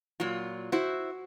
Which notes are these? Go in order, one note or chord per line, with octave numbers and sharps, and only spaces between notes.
A#2 F#3 F4
E4 F#4 C5